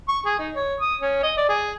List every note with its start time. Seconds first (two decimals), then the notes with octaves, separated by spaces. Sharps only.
0.09 C#6
0.25 G#4
0.39 D#4
0.55 C#5
0.80 D#6
1.01 C#4
1.23 D#5
1.38 D5
1.49 G#4